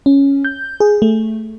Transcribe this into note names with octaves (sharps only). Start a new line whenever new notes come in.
C#4
G6
G#4
A3